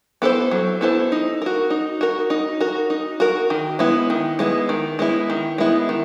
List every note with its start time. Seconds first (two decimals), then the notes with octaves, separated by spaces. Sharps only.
0.22 B3 E4 A4 C5
0.51 F#3
0.81 B3 E4 A4 C5
1.12 D#4
1.42 F#4 A#4
1.70 D#4
2.01 F#4 A#4
2.30 D#4
2.60 F#4 A#4
2.90 D#4
3.20 F#4 A#4
3.50 D#3
3.79 G#3 B3 E4
4.10 D#3
4.39 G#3 B3 E4
4.69 D#3
4.99 G#3 B3 E4
5.30 D#3
5.58 G#3 B3 E4
5.89 D#3